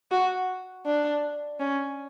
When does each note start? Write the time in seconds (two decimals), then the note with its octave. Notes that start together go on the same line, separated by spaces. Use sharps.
0.11 F#4
0.86 D4
1.60 C#4